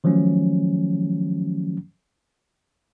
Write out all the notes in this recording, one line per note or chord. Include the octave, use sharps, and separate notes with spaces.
D#3 F3 F#3 A3 C#4